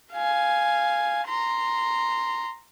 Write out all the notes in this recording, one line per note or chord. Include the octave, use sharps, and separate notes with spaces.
F5 G#5
A#5 C6